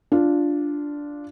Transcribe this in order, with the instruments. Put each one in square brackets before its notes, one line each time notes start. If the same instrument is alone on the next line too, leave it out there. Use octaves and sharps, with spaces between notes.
[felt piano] D4 F4